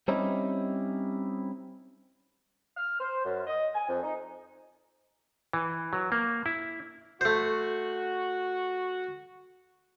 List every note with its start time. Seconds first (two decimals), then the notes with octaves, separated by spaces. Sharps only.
0.08 G3 C4 C#4 D#4 E4 G4
2.76 F6
3.00 C5
3.24 F#2
3.47 D#5
3.75 G#5
3.88 F2
4.03 D#4
5.53 E3
5.93 F#3
6.12 A#3
6.46 E4
7.21 A3 F#4 C5